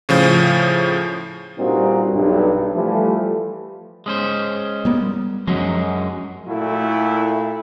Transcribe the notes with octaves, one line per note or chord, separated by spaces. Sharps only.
A2 C#3 F3
G2 A#2 G3 C4 D#4 F#4
B1 G2
E3 F3 G3 A3
G#3 C#4 C5
G3 A#3 B3
F#2 F3 F#3 G#3
A#2 A3 E4 F#4